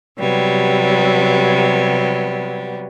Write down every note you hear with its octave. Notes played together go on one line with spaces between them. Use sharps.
C3 F#3 G3 B3